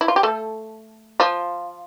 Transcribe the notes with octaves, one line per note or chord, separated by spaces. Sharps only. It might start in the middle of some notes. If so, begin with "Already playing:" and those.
E4
F4
G4
A3 A4
F3 F4